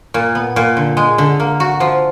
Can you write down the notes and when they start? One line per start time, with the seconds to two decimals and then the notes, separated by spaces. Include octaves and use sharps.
0.14 A#2
0.35 B3
0.56 A#2
0.77 D3
0.97 G#3
1.18 D3
1.40 A#3
1.60 F#4
1.80 F3